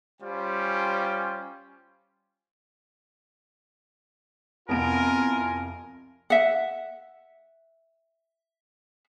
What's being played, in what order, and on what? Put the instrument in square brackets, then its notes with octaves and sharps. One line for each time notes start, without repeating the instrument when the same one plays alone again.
[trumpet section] G3 C#4 F4 C5 G5
[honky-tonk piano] C2 F2 D7 [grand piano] B3 [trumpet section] F4 G#5 [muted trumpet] A#4
[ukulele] E5 F#5